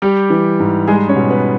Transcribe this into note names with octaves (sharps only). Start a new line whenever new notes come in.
G3 G4
E3
G#2
G3 G#3 G#4
C#4 C#5
B2
B3 B4